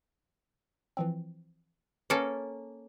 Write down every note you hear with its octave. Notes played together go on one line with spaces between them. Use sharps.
E3 F3 C4
A#3 C#4 A4 B4 A5